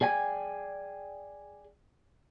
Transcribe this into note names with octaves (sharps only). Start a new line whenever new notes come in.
G#4 D5 G5 G#5